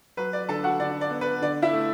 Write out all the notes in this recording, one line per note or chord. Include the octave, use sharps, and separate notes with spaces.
F#3 B4
D5
D3 A4 A5
F#4 F#5
D3 D5
D5
B3
B4
D3 D5
E4 E5
A3